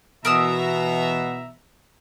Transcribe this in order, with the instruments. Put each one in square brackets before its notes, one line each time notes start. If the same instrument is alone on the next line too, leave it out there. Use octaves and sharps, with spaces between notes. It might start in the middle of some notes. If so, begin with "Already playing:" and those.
[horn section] B2 [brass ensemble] E3 E5 A#5 [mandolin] A#4 D#6 E6